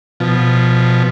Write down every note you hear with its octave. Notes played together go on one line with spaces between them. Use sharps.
B2 F3